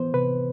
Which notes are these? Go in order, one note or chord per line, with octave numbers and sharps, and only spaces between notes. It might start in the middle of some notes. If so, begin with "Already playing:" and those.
Already playing: E3 B3 C5
C3 B4